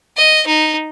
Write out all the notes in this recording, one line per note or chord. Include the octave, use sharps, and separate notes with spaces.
D#5
D#4